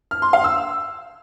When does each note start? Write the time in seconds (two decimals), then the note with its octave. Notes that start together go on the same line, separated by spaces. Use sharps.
0.11 F6
0.22 C6
0.33 F5
0.44 E6